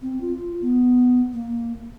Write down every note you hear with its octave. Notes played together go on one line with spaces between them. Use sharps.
C4
F4
B3
A#3